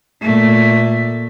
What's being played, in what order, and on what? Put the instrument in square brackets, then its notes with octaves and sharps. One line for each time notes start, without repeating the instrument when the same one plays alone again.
[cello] A#2 A3